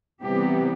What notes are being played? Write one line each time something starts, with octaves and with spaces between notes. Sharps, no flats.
C3 E3 G3 B3 G4